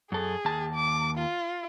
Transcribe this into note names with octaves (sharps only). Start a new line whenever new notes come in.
F#2 G#4 A4
D#2 A5
D6
F4